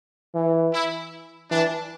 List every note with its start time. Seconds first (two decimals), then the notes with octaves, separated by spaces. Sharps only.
0.34 E3
0.73 E4
1.51 E3 D4